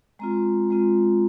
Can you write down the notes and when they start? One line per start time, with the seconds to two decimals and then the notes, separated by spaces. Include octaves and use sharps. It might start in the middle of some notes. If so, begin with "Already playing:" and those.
0.19 G#3 C4 F4 A#5
0.70 G#3 C4 F4